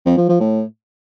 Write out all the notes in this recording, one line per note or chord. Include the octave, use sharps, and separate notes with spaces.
F2
F3
F3
A2